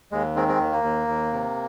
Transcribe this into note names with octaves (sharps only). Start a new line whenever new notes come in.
D#2 G#3
D#3 G#3 C4
G#3 C4
D#2
A#3
D#2
D#2
C3